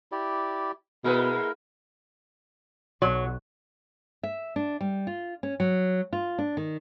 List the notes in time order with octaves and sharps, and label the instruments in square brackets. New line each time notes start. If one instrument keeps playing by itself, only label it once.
[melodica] E4 G4 D5
[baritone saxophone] B2 [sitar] G#3 A#3 B4 [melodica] E4 A#4
[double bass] B1 [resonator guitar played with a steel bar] F#3
[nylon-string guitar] E5
D4
G3
F4
C#4
F#3
F4
D4
D#3